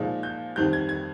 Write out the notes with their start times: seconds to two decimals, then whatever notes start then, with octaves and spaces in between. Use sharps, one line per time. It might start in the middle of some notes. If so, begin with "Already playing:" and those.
Already playing: A#2 F3 G#3 D#4
0.23 G6
0.56 F2 D#3 G3 C4 G6
0.73 G#6
0.89 G#6